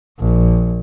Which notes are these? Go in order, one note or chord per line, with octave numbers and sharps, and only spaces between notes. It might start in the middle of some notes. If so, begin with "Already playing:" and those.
A#1